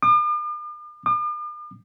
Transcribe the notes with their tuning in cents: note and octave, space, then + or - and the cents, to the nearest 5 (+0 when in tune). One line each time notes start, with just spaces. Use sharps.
D6 +45
D6 +45